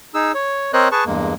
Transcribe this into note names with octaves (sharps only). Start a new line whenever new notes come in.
D#4 G#4 E6
C#5
C4 A#4 C5 C#5 D#5 F#6
G#4 B4 A5 C#6
E2 G2 G#3 A#3